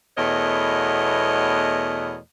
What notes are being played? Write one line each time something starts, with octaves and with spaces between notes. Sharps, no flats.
E2 B2 A3 A#4 C#5 D#5